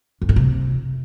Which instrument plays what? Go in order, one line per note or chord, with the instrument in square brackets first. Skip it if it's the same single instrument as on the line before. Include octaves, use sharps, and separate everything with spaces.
[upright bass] F2
A2
C3